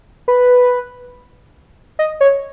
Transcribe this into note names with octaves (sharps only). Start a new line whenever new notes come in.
B4
D#5
C#5